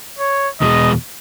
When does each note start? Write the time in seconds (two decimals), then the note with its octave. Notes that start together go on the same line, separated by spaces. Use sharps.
0.19 C#5
0.61 E2 B2 G#3 D#5